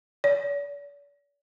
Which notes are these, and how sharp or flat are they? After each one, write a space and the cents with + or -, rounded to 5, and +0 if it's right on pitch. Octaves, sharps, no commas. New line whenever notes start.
D5 -45